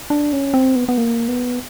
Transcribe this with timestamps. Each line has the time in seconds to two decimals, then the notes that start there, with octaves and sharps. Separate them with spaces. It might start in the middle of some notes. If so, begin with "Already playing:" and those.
0.10 D4
0.33 C#4
0.54 C4
0.76 B3
0.89 B3
0.98 A#3
1.28 B3